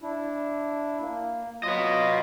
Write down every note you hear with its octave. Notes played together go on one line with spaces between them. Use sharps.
D4 E4
A#3
F#3 F4 B4 D#5